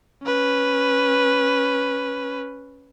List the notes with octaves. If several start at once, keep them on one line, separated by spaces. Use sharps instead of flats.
C#4 B4